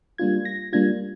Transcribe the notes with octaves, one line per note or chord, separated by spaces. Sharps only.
G3 A#3 D4 F4 G#6
A#6
G3 A#3 D4 F4 G#6